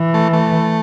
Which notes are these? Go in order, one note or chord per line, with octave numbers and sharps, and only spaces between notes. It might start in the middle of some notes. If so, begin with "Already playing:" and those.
Already playing: E3
A3
A3